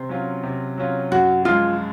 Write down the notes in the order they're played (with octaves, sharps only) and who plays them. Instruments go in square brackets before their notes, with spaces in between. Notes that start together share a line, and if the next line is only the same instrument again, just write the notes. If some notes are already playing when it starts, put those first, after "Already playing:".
Already playing: [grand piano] C3 [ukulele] C5
[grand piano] F#3 C#4 F4
C3
F#3 C#4 F4
[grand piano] F#2 [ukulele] F#4
[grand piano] F3 G#3 [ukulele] F4